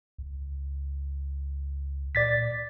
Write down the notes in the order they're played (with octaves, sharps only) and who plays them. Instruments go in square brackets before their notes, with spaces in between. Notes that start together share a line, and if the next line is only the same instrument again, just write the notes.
[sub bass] C#2
[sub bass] A#2 [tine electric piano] D5 A6 B6